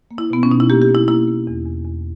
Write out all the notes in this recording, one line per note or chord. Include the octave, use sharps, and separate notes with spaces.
A#3
E4
B2 B3
C#4
B2 D#4
E4
A#3 G4
G4
A#3
E4
A#3 E4
A#3
E2
E2
E2